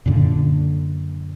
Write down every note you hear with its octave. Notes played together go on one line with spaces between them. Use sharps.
F#2 A#2 D3